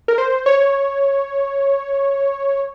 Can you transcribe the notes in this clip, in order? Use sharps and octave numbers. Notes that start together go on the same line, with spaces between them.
A#4
C5
C#5